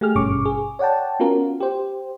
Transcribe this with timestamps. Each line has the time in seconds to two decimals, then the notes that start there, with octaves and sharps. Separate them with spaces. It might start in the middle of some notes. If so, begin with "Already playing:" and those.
0.01 A3 G4 G#4 F6
0.15 G#1 G2 B2 C#4 C#6 D6
0.45 G#4
0.79 C#5 D5 F#5 G5 A5
1.20 B3 C#4 F4 F#4 A#4
1.60 G4 C5